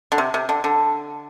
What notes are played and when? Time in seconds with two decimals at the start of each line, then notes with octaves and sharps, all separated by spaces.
0.12 D3
0.18 C3
0.34 C3
0.49 D3
0.64 D3